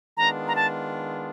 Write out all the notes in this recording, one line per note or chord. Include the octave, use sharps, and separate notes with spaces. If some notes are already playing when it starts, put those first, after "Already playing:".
D#3 G#3 B3 D4 F4 A#5
A#5
A5